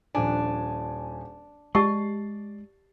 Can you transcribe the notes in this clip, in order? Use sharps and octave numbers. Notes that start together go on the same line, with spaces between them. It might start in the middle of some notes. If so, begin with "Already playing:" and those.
D#1 F3 D4 G#5
G#3 G4 D5 A5 C#6 A6 C7